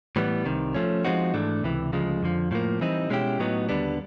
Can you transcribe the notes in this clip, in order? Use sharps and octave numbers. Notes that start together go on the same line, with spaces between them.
A2 E3 G3 B3
C2 C3 D#3
F3 A3 C#4
F3 G#3 C4 D#4 F#4
G#2 E3 A3 D4
C#2 C3 E3
D2 C#3 F3 G#3
F2 D3 F3
A2 F3 A#3
E3 G3 C4 D#4
B2 G#3 C#4 E4 G4
A2 F#3 B3 D#4
D#2 D3 G3 B3 D4